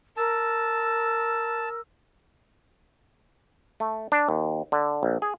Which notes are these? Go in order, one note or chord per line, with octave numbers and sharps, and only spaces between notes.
A#4 A5 E6
A3
D4
D#2
D3
A#1
G#4